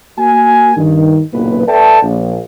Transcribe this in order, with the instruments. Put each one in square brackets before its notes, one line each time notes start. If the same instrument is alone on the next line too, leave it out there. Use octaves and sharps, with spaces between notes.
[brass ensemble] A#3 F#4 G#5
G2 D#3
F#1 B1 A#2 A#3 B4
A4 B4 D5 E5 G5 A5
A#1